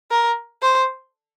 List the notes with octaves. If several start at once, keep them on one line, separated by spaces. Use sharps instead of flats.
A#4
C5